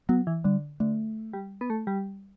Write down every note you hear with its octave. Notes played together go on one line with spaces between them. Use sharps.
F#3 B3
E3
D3 G3
D3 A3
G3
B3
A3
G3